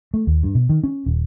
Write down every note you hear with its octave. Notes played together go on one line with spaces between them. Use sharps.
A3
D#2
G2
B2
D#3
C#4
D#1